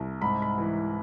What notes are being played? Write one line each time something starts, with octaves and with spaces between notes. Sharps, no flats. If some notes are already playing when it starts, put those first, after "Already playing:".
Already playing: C2
G#2 B5
B5
E3